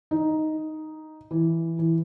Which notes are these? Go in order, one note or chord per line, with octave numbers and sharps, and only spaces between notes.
D#4
E3
E3